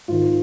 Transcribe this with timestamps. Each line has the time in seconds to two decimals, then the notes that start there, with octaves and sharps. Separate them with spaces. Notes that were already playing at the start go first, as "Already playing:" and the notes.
0.08 G#2 D#3 F4